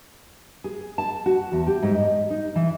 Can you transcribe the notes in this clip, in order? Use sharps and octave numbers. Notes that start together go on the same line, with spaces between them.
G#4
A5
F#4
E2
G4
G#2
D#5
D#4
E3